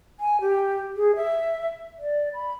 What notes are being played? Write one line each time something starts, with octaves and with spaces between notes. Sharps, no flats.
G#5
G4
G#4
E5
D5
B5